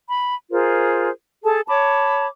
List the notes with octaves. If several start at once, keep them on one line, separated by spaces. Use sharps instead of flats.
B5
F4 G#4 A#4 C5
G#4 A4 A5
C#5 A5 B5 D6